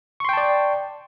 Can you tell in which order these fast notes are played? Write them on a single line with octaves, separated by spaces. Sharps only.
C#6 C6 G5 A5 D5